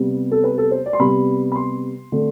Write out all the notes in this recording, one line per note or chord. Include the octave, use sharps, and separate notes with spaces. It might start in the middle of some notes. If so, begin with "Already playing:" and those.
Already playing: C3 G3 B3
A4
B4
A4
C5
D5
C6
C3 G3 B3 B5
B5
C6
D3 A3 C4